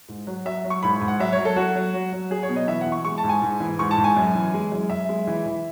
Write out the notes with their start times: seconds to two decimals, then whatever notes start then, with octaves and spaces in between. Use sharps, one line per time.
0.09 G#2
0.27 F#3
0.45 F#3 E5
0.64 F#3
0.70 C#6
0.83 G#2 B5
1.01 G#2
1.08 F#5
1.19 F#3 E5
1.32 C#5
1.38 F#3
1.45 A4
1.56 F#3 F#4
1.76 F#3
1.94 F#3
2.13 F#3
2.30 F#3 G#4
2.43 C#5
2.49 B2
2.56 D#5
2.67 E3 E5
2.81 F#5
2.86 E3
2.92 C#6
3.05 G#3 C#6
3.18 A5
3.24 G#2
3.29 G#5
3.42 G#2
3.60 E3
3.79 G#2 C#6
3.91 A5
3.98 G#2
4.04 G#5
4.17 F#2
4.35 E3
4.54 G#3
4.72 F#2
4.90 F#2 E5
5.09 G#3
5.27 E3
5.46 E3